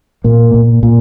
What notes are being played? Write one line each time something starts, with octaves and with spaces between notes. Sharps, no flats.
A#2 A#3
A#2
A#2